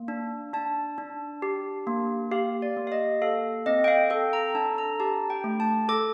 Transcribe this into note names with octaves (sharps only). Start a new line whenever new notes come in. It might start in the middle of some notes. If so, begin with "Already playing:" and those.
Already playing: A#3
D4
D4 A5
D4
G4
A#3
G4 F5
D5
A#3
F5
D#5
A4 F5
C4 D#5
G5
F5
A4 G5
A#5
D4 A5
A#5
G4 A5
G5
A3
A5
A4 D6